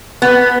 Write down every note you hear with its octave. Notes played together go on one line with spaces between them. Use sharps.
B3